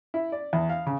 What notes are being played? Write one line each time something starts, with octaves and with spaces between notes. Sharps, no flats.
E4
D5
E2
F5
C#3